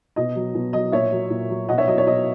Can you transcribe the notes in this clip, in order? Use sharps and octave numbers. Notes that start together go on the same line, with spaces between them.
B2 D#5
F#3
B2
F#3 D#5
A#2 C#5 E5
F#3
A#2
F#3
B2 D#5 F#5
C#5 E5
F#3 D#5
C#5
B2 D#5